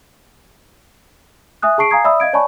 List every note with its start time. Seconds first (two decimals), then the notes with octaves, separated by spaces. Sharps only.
1.62 E5 G#5 D#6 F#6
1.78 G#4 A5 C#6 C7 D7
1.91 F5 G#5 A#5 D#6 G#6 C7
2.04 D5 E5 B5 D#6 E6
2.20 D#5 F5 G#6 D7
2.33 C#5 D5 G#5 A5 B5 C#6